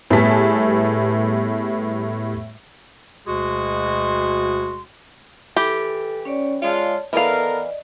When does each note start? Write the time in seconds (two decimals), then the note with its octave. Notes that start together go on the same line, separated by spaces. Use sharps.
0.10 A2 G3 B3 G#4 A5 B6
3.27 D2 B2 G#3 F#4 G#4 C6
5.57 E3 G4 A4
6.25 C#4 C#5 D5
6.62 G#3 F4 C#5 D5 A5
7.13 E3 B3 A4 A#4 D5 D#5 F5